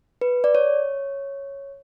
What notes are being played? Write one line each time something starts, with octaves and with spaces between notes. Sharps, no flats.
B4
D5
C#5